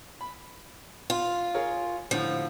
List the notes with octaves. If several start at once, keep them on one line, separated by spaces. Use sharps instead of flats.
B5
F4
G#4 A#4 C#5
A2 D3 F3